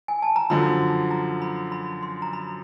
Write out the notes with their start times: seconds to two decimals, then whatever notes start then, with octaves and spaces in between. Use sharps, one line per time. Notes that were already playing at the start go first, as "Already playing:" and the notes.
0.08 G#5
0.22 A5
0.36 A#5
0.50 F#2 D3 F3 B5
1.11 A#5
1.42 B5
1.72 B5
2.02 C6
2.22 A#5
2.33 B5